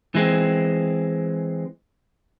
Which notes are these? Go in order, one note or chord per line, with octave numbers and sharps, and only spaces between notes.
E3 G#3 C4